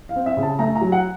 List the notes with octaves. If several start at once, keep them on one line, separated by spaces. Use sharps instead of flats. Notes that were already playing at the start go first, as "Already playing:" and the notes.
F5
C4
E5
C#3
A5
A3 A#5
A#5
F#3
F#5